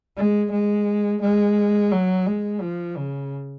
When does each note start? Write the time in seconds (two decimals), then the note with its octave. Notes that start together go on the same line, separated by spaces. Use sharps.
0.17 G#3
0.51 G#3
1.21 G#3
1.92 F#3
2.26 G#3
2.61 F3
2.96 C#3